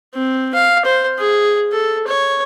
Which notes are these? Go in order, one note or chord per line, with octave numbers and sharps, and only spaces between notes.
C4
F5
C5
G#4
A4
C#5